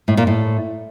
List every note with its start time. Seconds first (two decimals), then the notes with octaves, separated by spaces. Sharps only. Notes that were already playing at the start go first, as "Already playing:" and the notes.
0.08 A2
0.17 A#2
0.27 A2